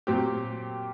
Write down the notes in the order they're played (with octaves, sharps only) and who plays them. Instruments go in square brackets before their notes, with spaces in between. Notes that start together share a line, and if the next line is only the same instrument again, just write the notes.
[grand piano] A#2 F#3 C4 G4